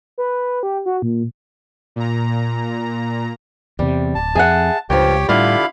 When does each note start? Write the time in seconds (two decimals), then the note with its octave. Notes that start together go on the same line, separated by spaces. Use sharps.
0.18 B4
0.63 G4
0.86 F#4
1.02 A#2
1.96 A#2 A#5
3.79 E2 C3 G3
4.15 D1 A5
4.35 F2 G#4 E5 F#5
4.90 C#2 G2 F3 G4 C#5 G5
5.29 A2 D3 G3 E4 F4 G4 F5 B5